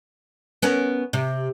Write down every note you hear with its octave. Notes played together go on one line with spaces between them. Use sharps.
B3 C#4 A#4
C3